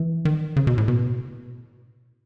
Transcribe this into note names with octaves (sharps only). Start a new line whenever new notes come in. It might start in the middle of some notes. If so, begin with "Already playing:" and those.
Already playing: E3
D#3
C#3
B2
A2
B2